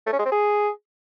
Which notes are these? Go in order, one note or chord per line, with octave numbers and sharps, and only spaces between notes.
A3
C#4
G#3
C4
G#4